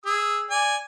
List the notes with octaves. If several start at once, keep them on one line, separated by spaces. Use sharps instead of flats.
G#4 E6
D5 G#5